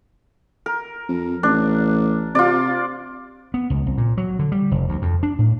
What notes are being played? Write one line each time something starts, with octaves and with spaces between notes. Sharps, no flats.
A#4
F2
A1 D4
C3 F4 D5
B3
C#2
C2
A#2
F#3
D3
G3
F1
D2
F2
D4
A2